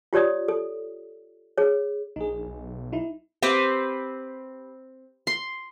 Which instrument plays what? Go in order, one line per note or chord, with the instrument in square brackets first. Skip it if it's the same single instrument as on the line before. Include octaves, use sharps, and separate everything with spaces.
[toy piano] F4 G4 C#5 D5 D#6
A4
G#4 C#5
[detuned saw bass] A#1 [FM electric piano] D#4 G#4
[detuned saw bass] B1
[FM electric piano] D#4 E4
[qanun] C4 G4 B4 C5
C6